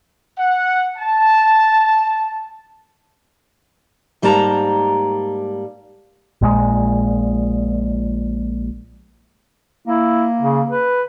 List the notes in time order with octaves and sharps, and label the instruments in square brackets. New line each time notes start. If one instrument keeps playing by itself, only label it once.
[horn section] F#5
A5
[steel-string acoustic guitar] G#2 G3 A#3 D5 A5 A#5
[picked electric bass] A#1 A#2 C#3 G#3
[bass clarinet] A#3 [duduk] E4
[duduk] C#3
B4